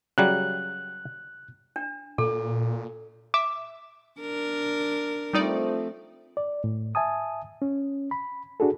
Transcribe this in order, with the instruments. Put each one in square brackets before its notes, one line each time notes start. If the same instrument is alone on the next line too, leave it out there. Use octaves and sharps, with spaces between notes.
[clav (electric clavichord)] C#3 F#3 G3 [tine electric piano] F#6
[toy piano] D4
[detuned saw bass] A#2 [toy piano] A4
[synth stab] E5 [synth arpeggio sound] D6
[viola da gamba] D4 A#4
[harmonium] F3 A3 C4 [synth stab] G3 D#4 D5
[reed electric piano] D5
A2
E5 G#5 A5 D#6
C#4
B5
D4 F#4 G#4 A4